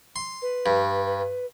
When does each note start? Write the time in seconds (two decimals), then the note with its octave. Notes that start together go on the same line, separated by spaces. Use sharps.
0.16 C6
0.42 B4
0.66 G2
1.05 B4